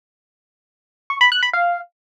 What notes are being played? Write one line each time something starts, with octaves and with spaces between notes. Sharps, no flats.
C#6
B5
F#6
B5
F5